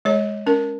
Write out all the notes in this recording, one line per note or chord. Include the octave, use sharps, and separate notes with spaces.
G#3 C#5
C#4 A#4